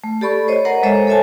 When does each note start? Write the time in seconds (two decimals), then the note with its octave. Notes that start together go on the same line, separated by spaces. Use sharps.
0.04 A3
0.21 G4 A4 D5 B5 C#6
0.48 C5 C#5 D#5
0.65 A#4 C5 D#5 F#5 A#5
0.83 G#3 A4 C5 C#5 D#5 E5
1.07 A4 C#5 E5 G#5 A5